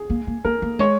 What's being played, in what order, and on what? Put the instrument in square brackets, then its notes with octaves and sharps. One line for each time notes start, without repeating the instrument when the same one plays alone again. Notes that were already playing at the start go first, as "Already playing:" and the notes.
Already playing: [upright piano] G#4
[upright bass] A#3
A#3
[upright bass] A#3 [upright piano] A#4
[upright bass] A#3
[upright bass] G#3 [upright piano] C#5